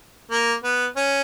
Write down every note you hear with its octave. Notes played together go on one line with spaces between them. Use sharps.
A#3
B3
C#4